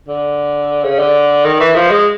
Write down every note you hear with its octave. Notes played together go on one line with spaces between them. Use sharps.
D3
C#3
D3
D#3
E3
F3
G#3